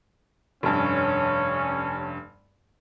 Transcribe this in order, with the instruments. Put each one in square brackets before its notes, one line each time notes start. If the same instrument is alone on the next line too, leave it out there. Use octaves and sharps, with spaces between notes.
[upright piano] F1 G2 [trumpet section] C#4